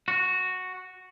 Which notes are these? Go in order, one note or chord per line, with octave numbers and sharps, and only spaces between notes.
F#4